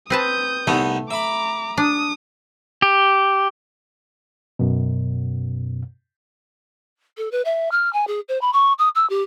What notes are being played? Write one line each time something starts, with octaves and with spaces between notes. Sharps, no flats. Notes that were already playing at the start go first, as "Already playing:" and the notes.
C4 B4 A5 D#6 G6
C2 A3 B3 D#4
E5 A#5 B5 D6
D4 D#6
G4
F#2 B2
A4
B4
E5
F6
G#5
G#4
C5
B5
C#6
D#6
E6
G4